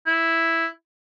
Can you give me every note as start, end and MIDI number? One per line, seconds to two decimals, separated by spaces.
0.06 0.67 64